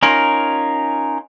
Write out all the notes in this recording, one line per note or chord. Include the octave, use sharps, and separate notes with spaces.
C#4 D#4 F4 A#4